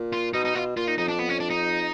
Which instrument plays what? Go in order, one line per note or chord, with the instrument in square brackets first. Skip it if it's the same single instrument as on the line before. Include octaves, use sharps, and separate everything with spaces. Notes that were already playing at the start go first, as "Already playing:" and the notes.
Already playing: [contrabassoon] A#2
[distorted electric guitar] F4
[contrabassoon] B2 [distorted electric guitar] D#4
[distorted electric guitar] D#4
[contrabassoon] B2 [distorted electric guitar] F4
[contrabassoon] A#2 [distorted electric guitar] F4
[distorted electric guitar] D#4
[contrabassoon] F2 [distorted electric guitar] D#4
[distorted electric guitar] D4
B3
C#4
D4
D#4